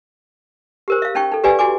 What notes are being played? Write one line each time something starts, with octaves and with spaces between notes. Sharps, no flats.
G4 A#4 C5
E5 F5
C#4 D#4 G5 C#6
D#4 A4
G4 B4 D5 F5 G#5
E4 F#4 G#5 D6